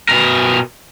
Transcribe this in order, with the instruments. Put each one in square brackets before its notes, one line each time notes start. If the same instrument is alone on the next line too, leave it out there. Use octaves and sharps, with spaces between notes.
[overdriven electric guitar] B2 A#4